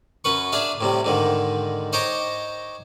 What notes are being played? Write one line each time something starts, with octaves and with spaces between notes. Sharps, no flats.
F#2 C#4 B4 C#6
D4 G#4 E5 F5
A2 C3 G3
G#2 D3 D#3
C5 C#5 D#5 G5 A#5 D6